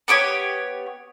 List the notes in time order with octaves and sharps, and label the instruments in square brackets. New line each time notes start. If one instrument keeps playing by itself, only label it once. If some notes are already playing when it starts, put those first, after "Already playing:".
[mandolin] B3 G4 C5 C#5